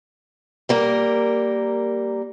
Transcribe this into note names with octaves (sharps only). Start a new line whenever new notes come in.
G3 A#3 A#4